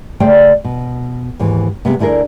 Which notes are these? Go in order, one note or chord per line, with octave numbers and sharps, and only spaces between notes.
C#3 A3 A4 C5 D5 G5
B2
D#2 G#2 E3
C3 G#3 A#3 B3
D2 D3 E4 G#4 A#4